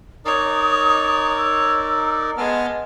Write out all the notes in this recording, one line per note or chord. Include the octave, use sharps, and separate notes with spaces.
D#4 A#4 C#5 D5 D#6
E6
G#3 B3 A5 F6